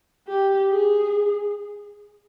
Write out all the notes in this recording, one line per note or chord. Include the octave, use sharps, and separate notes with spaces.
G4
G#4